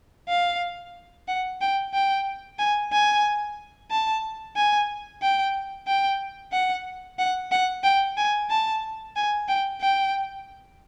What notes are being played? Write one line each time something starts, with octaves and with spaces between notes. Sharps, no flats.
F5
F#5
G5
G5
G#5
G#5
A5
G#5
G5
G5
F#5
F#5
F#5
G5
G#5
A5
G#5
G5
G5